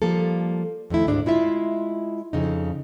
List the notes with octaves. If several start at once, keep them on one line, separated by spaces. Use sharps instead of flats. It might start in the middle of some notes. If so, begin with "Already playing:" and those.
F3 G3 A#3 A4
F2 D#3 A3 E4
D2 G#2 D4
G#3 E4 F4 E5
F2 C#3 D#4